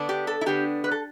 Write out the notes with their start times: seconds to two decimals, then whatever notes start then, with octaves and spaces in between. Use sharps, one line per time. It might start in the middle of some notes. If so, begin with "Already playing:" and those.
Already playing: D3 B3 D4
0.09 G4
0.27 A4
0.41 E4
0.46 D3 B3 D4 G4
0.84 B4
0.91 A4